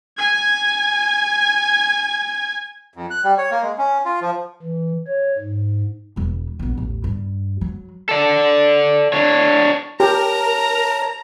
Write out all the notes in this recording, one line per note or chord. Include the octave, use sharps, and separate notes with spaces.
G#5 G#6
F2
F#6
G3
C#5
A#3
G#3
C#4
F4
F3
E3
C#5
G#2
E1 E2
A#1 B3
A1 D#2
G2
F#3
A4 D5
D4 C#5
G4 A#4 C#5 A5 A#5